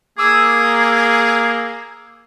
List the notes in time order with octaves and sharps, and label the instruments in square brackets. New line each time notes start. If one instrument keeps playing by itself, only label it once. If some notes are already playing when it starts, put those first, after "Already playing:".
[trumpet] A#3 [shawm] G#4 [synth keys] D6 E6